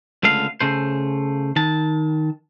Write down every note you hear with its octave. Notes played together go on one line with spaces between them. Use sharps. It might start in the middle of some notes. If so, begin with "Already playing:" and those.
C#2 D3 A3 F5
C#3 A3 C5
D#3 A5